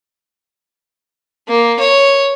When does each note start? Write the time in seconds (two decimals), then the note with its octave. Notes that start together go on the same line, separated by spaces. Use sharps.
1.48 A#3
1.80 C#5